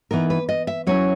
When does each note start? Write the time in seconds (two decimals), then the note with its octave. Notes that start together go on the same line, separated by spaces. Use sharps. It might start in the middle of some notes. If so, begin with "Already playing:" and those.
0.11 E3 B3 D#4 A#4
0.30 B4
0.49 D#5
0.67 E5
0.87 F#3 C#4 E4 C#5